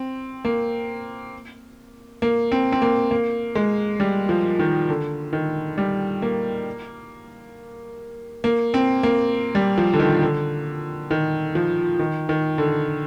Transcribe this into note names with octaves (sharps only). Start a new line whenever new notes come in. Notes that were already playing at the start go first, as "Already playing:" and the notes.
Already playing: C4
A#3
A#3
C4
C4
A#3
A#3
G#3
G3
F3
D#3
D3
D#3
G3
A#3
A#3
C4
A#3
G3
F3
D3
D#3
D3
D#3
F3
D#3
D#3
D3